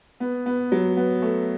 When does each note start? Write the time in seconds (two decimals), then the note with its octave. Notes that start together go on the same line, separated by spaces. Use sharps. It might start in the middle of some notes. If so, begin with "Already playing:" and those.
0.20 B3
0.46 B3
0.72 F#3
0.97 B3
1.22 A3